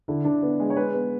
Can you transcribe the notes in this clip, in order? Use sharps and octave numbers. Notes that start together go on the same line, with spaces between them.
D3 E4
D3 D4
B3
G#3
C#5
G#3 B4
B3